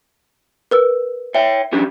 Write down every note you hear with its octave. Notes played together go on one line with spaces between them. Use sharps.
A#4 B4 E6
C#5 E5 G5
C#4 D4 G4